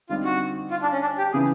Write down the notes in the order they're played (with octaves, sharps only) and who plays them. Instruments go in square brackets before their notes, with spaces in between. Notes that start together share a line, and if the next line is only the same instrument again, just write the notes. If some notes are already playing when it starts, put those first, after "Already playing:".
[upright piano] D3 G3 C4 D#4 [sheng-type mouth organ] F4
[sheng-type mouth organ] F#4
F4
D4
C#4
D4
G4
[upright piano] C#3 E3 [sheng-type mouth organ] G#4